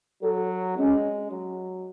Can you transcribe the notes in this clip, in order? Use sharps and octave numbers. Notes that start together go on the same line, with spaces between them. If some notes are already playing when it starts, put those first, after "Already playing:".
F#3 A4
G#3 C#4
F#3